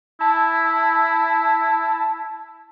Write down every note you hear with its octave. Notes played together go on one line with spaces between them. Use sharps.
E4 A5